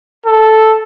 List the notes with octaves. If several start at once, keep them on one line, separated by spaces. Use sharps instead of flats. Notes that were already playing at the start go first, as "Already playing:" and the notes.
A4